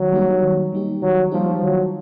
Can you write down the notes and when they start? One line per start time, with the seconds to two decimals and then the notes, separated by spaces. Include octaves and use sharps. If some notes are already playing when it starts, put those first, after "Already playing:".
Already playing: D#3 F#3
0.12 G3 A#3 D#4 G4
0.42 D#3
0.72 G3 A#3 D#4 G4
1.02 D#3 F#3
1.31 F3 G3 A#3 D#4 G4
1.62 D#3 F#3